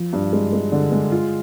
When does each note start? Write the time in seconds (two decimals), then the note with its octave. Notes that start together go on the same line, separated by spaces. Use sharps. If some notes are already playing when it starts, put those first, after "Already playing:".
Already playing: F3
0.13 G2
0.33 G#3
0.53 G#3
0.72 D3
0.92 G#3
1.11 F4